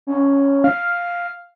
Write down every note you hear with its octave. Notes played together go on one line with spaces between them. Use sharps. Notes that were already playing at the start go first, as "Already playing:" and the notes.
C#4
F5